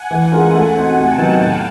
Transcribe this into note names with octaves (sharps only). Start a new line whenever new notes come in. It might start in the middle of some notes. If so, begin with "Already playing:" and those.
Already playing: F#5 G#5
E3 F#5 G#5
G#3 C#4 F4 A#4
A3
C4 D#4 F#4
C3 G5 A5
D#3 F#3 B3 D#4
A2 F5 G5